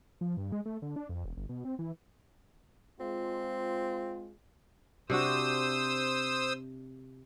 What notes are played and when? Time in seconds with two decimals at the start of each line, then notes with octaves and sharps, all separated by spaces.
0.21 F3
0.37 G2
0.52 G#3
0.66 A3
0.82 D3
0.96 D4
1.09 F2
1.25 E1
1.37 G1
1.49 B2
1.65 C4
1.79 E3
3.00 G#3 C4 F4
5.10 C3 D4 F#4 C5 D#6 E6